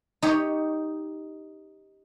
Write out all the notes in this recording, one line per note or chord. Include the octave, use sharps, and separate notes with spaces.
D#4 G4 C#5